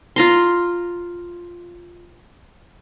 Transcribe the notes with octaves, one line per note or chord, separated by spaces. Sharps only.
F4 A#5 C6